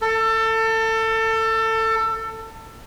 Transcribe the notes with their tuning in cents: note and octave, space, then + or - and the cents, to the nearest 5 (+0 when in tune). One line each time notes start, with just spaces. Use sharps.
A4 +25